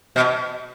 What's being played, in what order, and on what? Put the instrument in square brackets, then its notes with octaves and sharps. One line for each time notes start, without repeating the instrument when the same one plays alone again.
[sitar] B2